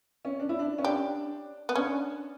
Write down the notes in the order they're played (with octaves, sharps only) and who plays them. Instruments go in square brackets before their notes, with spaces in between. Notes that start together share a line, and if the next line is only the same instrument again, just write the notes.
[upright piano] C#4
D4
E4
D4
C#4
[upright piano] D4 [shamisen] G4
[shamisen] B3
[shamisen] C#4 [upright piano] D4